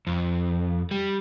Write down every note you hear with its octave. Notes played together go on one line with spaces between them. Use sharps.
F2
G3